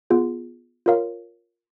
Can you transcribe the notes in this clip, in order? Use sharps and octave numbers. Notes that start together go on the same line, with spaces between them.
B3 F4 G#4
F4 A#4 C#5 F5